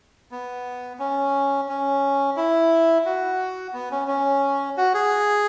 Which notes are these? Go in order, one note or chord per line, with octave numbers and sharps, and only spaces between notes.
B3
C#4
C#4
E4
F#4
B3
C#4
C#4
F#4
G#4